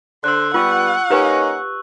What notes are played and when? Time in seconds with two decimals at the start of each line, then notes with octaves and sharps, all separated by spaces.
0.24 D3 C5 E6 F#6
0.54 G3 B3 F4 F#5 C#6 E6
1.10 A#3 C#4 D#4 G4 B4 F5